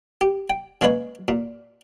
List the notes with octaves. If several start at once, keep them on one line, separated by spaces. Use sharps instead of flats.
G4
G5
C#3 G#3 A#3 B4 C#5
A#2